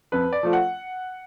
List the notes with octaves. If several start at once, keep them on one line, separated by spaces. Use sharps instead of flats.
F2 B4
D5
F3 A3 F4
F#5